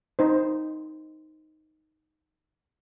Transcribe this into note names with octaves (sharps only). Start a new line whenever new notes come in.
D#4 C5